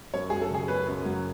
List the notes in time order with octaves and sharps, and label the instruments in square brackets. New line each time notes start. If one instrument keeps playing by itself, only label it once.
[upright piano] F#2 [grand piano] C#5
[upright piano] F#3 [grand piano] G#4
[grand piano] A4
[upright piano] C#3 [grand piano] G#4
[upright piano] C#4 [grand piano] B4
[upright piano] F#2
F#3